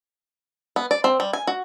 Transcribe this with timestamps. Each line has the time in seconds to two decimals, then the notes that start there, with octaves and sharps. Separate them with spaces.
0.76 B3
0.91 D5
1.04 C4
1.20 G3
1.33 G#5
1.47 F#4